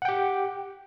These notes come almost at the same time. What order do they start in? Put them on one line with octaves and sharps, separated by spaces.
F#5 G5 G4